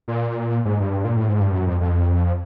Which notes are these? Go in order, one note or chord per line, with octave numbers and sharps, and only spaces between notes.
A#2
G#2
G2
A#2
A2
G#2
G2
F#2
F2
F2